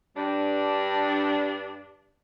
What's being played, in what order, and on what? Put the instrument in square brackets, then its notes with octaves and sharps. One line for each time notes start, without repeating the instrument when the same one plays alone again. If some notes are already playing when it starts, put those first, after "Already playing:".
[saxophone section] G2 D4